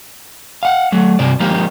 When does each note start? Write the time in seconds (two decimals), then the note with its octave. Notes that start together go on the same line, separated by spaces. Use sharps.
0.63 F5 F#5
0.92 F#3 A3
1.19 G2 C3 D5
1.40 F3 G#3 A#3 D#4 G4